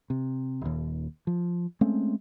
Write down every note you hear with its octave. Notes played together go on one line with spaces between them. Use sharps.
C3
D#1 D#2
F3
G#3 A3 C4 C#4